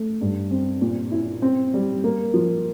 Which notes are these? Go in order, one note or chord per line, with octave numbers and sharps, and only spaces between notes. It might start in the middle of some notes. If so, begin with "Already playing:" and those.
Already playing: A3
G2
C4
A#2
E4
C4
G3
A#3
F3